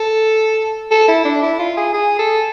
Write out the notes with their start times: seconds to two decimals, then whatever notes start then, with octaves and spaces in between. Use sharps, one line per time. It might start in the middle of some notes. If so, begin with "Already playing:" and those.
Already playing: A4
0.91 A4
1.08 E4
1.25 D4
1.42 E4
1.59 F4
1.77 G#4
1.94 G#4
2.19 A4